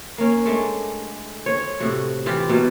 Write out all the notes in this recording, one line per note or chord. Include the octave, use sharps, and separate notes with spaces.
A#3 C#4
G#3 A3 D4
C5 C#5
A2 C3 F#4
E3 F4 G4
B2 F#3 F4